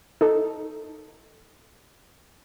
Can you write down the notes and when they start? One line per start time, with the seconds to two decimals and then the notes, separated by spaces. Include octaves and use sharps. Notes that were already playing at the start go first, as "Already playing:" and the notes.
0.21 D#4 A4